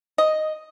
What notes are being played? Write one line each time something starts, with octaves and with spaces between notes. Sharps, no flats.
D#5